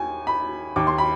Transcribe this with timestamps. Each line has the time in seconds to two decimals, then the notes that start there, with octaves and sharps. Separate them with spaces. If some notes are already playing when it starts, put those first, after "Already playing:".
Already playing: D#2 G#5
0.27 B5
0.76 D#2 D#3 D6
0.87 C6
0.98 B5